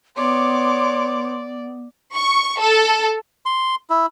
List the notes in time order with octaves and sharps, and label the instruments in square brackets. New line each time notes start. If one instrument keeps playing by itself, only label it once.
[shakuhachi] B3 [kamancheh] C#5 D6 [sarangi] D5 [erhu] C6
[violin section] C#6
A4
[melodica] C6
E4